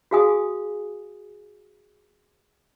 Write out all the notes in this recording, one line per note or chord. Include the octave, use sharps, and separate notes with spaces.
F#4 G#4 F5 G#5 D#6